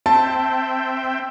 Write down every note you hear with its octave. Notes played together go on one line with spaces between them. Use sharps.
C4 E5 G5 A5